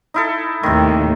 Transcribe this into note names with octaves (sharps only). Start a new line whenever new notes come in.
D#4 E4 A4
D#2 A2 C3 D#3